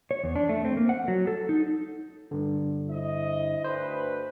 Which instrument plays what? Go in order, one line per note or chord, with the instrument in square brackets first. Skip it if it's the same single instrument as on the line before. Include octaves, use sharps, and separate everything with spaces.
[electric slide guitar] C#5
E2
D4
A3
C4
A#3
F#5
F#3
A4
D#4
[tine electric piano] G2 D3
[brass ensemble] E4 C5 D#5
[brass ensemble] D2 B4 [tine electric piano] C5